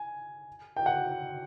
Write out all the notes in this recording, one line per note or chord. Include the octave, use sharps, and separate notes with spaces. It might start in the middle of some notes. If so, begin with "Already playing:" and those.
Already playing: G#5
G5
F#5